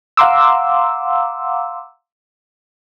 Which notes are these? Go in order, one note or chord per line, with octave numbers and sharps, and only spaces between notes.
F5 F#5 A#5 C6 D6 E6